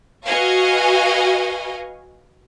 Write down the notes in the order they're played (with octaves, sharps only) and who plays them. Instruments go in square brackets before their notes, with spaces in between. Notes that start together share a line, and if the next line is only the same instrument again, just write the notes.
[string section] F#4 B4 D#5 F5 G#5 C#6